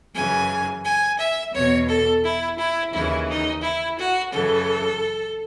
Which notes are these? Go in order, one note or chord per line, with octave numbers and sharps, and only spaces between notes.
F#2 C#3 E3 G#5
G#5
E5
E2 B2 C#5
A4
E4
E4
D#2 C#3 E3 E4
D#4
E4
F#4
F#2 C#3 E3 A4